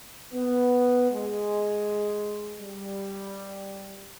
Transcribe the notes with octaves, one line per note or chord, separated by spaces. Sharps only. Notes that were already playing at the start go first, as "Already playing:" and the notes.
B3
G#3
G3